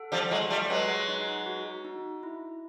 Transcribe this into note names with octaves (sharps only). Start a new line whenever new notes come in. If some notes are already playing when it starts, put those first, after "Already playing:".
Already playing: A4 F#5
F3 G3
F#3 G#3 F4
G3 A3
F#3 G#3 B4
D#4
F#4
D#4
E4